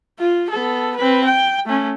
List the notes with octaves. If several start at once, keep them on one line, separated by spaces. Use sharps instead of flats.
F4
B3 A4
C4 B4
G5
A3 C#4